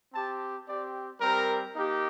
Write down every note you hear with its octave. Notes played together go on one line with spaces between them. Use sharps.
C4 G4 A5
C4 G4 D5
G3 C4 G4 A#4
A#3 D#4 G4